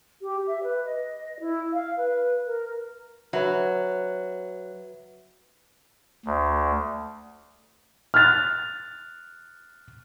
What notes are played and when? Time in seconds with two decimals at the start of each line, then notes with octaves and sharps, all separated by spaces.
0.22 G4
0.47 E5
0.63 B4
0.85 D#5
1.40 E4
1.73 F5
1.97 B4
2.46 A#4
3.33 F#3 B4 E5
6.26 D2
8.14 F6 F#6 A6 F7